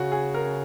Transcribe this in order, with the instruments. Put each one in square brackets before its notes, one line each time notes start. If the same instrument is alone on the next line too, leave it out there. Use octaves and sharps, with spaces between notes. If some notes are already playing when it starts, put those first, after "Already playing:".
Already playing: [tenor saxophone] C#3 [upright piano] F#4
[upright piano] G#4
A#4